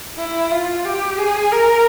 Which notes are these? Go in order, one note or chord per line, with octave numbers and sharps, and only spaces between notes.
E4
F4
G4
G#4
A#4